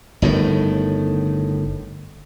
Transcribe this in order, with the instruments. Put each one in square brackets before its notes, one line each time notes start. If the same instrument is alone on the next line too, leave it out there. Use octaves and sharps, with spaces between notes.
[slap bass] G1 A2 D#3